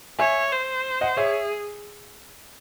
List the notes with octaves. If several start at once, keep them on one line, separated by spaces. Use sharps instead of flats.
C#5 E5 G#5
C5
D#5 F#5
G#4 C#5 E5